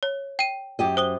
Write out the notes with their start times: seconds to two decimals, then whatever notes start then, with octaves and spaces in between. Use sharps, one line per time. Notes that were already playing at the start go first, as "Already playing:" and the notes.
0.03 C#5
0.39 G5 D#7
0.79 F#2 G4 D#5
0.97 C5 D#6 G7